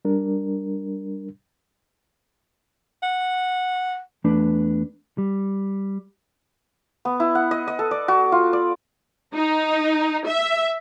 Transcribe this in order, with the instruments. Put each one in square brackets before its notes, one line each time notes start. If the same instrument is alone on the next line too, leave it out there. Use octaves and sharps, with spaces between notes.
[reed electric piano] G3 D4 A#4
[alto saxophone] F#5
[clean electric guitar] E2 A3 D4 B4
G3
[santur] B3
E4
F#5
D#5
D#5
A4
D5
F#4
F4
D5
[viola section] D#4
E5